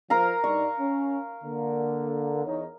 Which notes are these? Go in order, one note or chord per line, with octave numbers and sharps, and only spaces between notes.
F3 A#4 F5 A#5
G2 D#4 D5 C#6
C#4
D3 A#3
E2 D#4 C#5